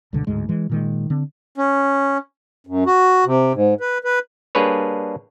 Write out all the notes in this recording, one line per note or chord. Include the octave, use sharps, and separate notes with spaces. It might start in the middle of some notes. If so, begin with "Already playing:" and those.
C#2 G2 B2 D3
D1 D2 G#2 G#3
E3 G#3
A#2 D#3 G#3
D3 C4
C#4
F#2
F#4
C3
G#2
B4
B4
G3 A#3 D4 G#4 B4 C#5